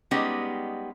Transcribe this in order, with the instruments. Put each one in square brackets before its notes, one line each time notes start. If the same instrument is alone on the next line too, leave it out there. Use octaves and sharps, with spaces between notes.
[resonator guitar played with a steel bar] G3 G#3 B3 C#4 D#4 G4